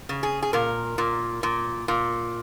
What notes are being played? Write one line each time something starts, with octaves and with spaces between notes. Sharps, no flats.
C#3
G#4
G#4
A#2 A#4
A#2
A#2
A#2